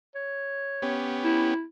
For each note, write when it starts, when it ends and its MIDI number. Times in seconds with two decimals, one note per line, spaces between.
0.15 0.95 73
0.82 1.54 59
0.82 1.54 61
0.82 1.54 67
1.24 1.64 64